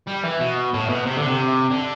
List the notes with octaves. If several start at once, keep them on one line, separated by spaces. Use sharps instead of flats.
G3
E3
B2
A2
B2
C3
D3
C3
D3